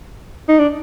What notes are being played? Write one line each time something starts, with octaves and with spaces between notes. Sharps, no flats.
D#4
D4